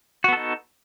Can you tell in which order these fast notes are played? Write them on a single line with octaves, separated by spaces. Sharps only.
F#4 B3 A4 D#4